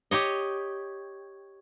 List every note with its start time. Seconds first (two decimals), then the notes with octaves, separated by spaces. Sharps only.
0.11 G4 C#5 D#5